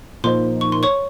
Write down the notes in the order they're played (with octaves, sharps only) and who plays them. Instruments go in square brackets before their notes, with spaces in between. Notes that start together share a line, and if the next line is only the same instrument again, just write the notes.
[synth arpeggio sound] A#2 F3 A#3 D#4 [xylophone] C5 C6
[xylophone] C#6
C6
C#5 C#6